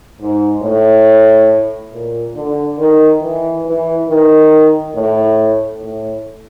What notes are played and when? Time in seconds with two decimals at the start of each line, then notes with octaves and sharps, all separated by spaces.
0.20 G#2
0.62 A2
1.92 A#2
2.35 D3
2.78 D#3
3.22 E3
3.66 E3
4.09 D#3
4.94 A2
5.81 A2